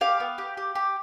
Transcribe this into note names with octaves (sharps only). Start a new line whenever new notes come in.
G4 F5
B3
G4
G4
G4